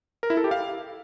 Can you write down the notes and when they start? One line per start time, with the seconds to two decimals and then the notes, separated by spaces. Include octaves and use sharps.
0.23 A#4
0.30 E4
0.37 A4
0.44 G4
0.51 F5